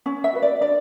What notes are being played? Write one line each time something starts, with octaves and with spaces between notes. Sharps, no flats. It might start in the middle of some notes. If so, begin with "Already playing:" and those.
C#4
E5
F#4 B4
D5
D4 D5